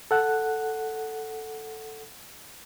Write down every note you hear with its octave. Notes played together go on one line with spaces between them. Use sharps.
A4 F#5